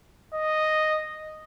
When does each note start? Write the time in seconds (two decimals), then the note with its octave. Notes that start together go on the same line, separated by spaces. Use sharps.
0.34 D#5